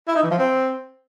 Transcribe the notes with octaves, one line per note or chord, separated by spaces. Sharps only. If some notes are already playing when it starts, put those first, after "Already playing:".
E4
D#4
E3
F3
C4